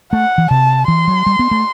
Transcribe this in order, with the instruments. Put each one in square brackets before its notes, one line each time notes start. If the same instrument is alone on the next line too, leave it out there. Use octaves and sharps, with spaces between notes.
[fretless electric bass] A3 [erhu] F#5
[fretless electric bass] E3
[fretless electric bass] C3 [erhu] A5
[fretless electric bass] E3 [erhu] C6
[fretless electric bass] F#3
G3
B3
A3